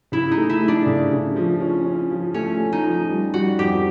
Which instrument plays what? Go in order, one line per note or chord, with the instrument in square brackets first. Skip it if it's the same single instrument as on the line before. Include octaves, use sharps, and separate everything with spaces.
[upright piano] C#3 [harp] E4
[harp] D#4
[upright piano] A3
[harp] E4
[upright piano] A3
[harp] D4
[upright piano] C#3
C#3
F3
C#4
C#4
F3
[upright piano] A3 [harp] C#4
[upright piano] A3
[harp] D#4
[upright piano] F3
G3
[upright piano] G3 [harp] F#4
[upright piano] F2 [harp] G4